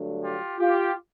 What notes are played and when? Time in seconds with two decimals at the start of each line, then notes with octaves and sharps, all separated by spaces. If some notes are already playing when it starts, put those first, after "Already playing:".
Already playing: G2 D3 F#3 A3
0.23 F4 G4
0.60 F4 G4